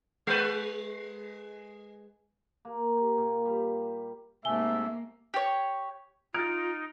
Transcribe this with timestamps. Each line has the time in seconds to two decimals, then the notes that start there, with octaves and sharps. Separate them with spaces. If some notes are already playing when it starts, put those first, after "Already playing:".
0.27 G#3 B4
2.65 A#3
2.97 G4
3.17 A#2
3.45 G3
4.45 G#2 C3 A3 A#3 E5 G#5 G7
5.34 G4 C#5
6.34 D#4 F4 F6 A6 D7